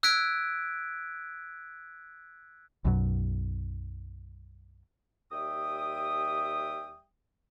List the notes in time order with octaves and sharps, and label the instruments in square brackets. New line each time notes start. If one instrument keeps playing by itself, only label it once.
[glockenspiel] E6 F#6 G#6 B6 D7
[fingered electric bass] B1 F#2 B2 F#3
[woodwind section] D#2 G3 E5 G5 D#6